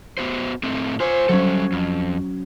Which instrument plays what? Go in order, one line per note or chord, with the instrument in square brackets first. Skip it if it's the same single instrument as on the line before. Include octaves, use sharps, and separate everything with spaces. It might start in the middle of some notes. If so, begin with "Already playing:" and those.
[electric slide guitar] B3 F#4 C5
A2 A3 C4
[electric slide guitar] F4 G#5 [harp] C5 C#5
[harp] F#3 C#4 [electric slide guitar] G3 A4
[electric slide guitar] F2